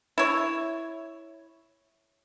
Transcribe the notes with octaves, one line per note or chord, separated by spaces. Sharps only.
E4 C#5